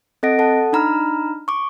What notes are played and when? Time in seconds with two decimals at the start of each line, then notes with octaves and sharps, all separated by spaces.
0.23 C4 A4 D#5 F#5 A#6 D7
0.39 A4 F#5 A5
0.73 D4 D#4 A#5 B5 F6
1.48 C#6 D6